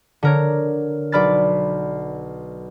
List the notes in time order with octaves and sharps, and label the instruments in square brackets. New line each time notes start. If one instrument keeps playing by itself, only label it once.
[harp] D3 A#4 C#5
B1 D5 B5 F6 A6